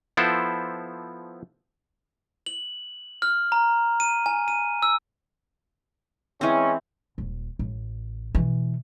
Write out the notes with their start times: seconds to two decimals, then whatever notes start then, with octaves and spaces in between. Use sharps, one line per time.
0.17 F3 B3 E4 A4 C5
2.46 F#7
3.22 F6
3.52 A#5
4.00 D#7
4.26 G#5
4.48 D#7
4.83 E6
6.41 E3 G#3 C4 C#4
7.18 D#1
7.59 A1
8.35 B2 E3